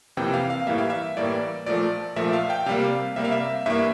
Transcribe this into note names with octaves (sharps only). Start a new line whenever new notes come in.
F2 C3 E3 A#3 G5
F5
F5
A2 E3 G3 A#3 E5
F5
E5
A2 E3 G3 A#3 D5
A#2 F3 A3 D5
A#2 F3 A3 E5
F5
G5
C3 G3 A#3 F5
C3 G3 A#3 E5
F5
E5
G2 E3 A#3 E5